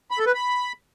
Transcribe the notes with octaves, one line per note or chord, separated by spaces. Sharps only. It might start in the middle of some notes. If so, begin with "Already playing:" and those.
B5
A4
B4
B5